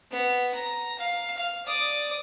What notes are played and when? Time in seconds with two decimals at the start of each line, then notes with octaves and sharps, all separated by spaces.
0.11 B3
0.54 A#5
0.98 F5
1.37 F5
1.66 D5 D#6